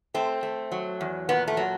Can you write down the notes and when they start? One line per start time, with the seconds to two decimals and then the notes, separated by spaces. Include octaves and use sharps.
0.14 A3 C4
0.43 A3
0.72 F#3
1.01 E2
1.29 A#2 B3
1.48 A3
1.57 F#3